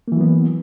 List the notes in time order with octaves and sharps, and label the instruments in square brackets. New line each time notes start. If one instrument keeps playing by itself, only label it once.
[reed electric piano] A#3
E3
F#3
B3